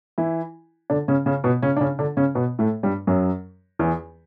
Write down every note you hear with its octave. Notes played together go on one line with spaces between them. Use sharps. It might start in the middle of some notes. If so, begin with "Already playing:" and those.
E3 E4
D3 D4
C#3 C#4
C#3 C#4
B2 B3
C#3 C#4
D4
C#3 C#4
D3 D4
C#3 C#4
B2 B3
A2 A3
G2 G3
F#2 F#3
E2 E3